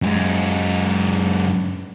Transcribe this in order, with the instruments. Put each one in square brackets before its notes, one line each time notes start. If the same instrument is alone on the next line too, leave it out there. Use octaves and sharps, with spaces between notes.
[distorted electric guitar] F#2 G#3